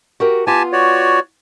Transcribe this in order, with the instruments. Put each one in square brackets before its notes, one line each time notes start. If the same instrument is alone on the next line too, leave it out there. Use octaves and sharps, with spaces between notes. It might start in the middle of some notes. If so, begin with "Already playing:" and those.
[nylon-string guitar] F#4 G4 A#4
[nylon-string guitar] B3 F4 [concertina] G4 G#5 A5
[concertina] F#4 C#5 D5